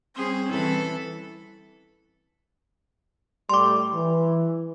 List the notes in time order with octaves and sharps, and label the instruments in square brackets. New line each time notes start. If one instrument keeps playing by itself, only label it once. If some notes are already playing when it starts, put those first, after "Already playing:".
[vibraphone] G3 C4 [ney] C#4 [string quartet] G#4 C5
[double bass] E3 [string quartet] A4 B5
[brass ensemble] A2 G3 [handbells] C6 D6
[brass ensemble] E3